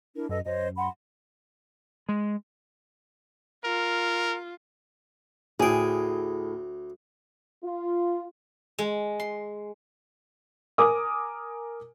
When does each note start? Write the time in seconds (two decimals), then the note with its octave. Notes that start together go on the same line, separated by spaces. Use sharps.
0.15 D4 E4 A#4
0.29 F#2 A4 B4 D#5
0.46 F#2 C5 C#5 D#5
0.78 F#5 B5 C6
2.09 G#3
3.65 F4 A#4
5.60 D2 A2 G#4 G5
7.64 F4
8.79 G#3
9.20 C6
10.78 A#4 G#5 D6 D#6